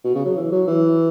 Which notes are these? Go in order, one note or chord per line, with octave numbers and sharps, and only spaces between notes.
B2
C#3
F#3
E3
F#3
E3